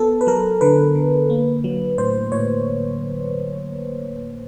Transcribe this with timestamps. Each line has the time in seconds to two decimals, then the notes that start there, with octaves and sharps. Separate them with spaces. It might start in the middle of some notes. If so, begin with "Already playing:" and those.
Already playing: B3 A4
0.21 B4
0.27 F#3 A#4
0.61 D3 B4
0.95 D3
1.30 A#3
1.64 F#3
1.98 A2 C5
2.32 A2 C#5